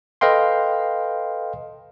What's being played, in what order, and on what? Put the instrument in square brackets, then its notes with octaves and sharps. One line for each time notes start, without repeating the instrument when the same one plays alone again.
[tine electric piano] A4 B4 D#5 F5 G5 C6